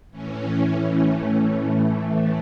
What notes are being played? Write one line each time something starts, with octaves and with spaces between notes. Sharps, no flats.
A2 E3 C#4
A3
A2 E3